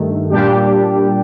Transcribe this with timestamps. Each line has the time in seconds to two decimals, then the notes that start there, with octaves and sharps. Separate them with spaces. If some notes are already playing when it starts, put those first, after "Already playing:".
Already playing: G2 D#3 A3
0.30 A#2 G3 D4 G4